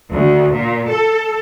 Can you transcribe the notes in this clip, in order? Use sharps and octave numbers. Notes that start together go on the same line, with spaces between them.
D2
A#2
A4